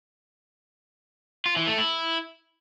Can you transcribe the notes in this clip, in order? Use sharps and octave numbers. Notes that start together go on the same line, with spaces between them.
F4
E3
A3
E4